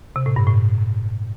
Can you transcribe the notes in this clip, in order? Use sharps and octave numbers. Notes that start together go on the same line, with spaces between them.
C3
A2
G2
A2